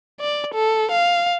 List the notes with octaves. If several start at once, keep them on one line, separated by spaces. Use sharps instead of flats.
D5
A4
F5